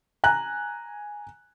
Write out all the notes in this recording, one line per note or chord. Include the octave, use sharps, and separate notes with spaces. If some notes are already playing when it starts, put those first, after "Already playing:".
G#5 A#5 F#6